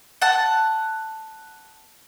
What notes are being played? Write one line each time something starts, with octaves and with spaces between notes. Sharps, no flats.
F#5 A5